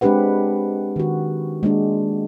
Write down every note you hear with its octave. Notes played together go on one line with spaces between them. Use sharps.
G#3 C4 D4 G4 B4 F#5
D#3 F#4
G#3 A#3 D4